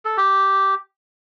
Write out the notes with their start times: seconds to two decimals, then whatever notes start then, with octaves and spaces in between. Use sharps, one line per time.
0.05 A4
0.17 G4